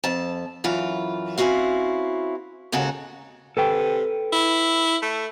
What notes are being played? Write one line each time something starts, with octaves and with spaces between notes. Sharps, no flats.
F2 A5
F#2 E3 F4
C4 C#4 E4 F#4 F5
D#2 G#2 C#3 F#4 A4 A#4
C3 A4 B4 G5
E4
A3